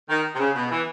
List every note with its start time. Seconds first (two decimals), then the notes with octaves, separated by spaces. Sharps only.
0.09 D#3
0.35 C3
0.39 C#3
0.55 B2
0.70 E3